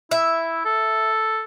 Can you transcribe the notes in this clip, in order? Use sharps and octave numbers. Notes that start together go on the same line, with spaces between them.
E4 E5
A4